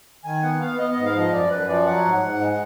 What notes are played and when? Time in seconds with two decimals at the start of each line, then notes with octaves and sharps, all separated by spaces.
0.24 D#3 G#5
0.43 B3 F#5
0.61 B3 F5
0.79 B3 D#5
0.92 G#2 D#5
1.05 F5
1.15 F3 D#5
1.32 F#2 D5
1.51 F#2 B4
1.68 F3 D5
1.86 F#3 F#5
2.05 G#2
2.14 F#5
2.23 G#2
2.41 G#3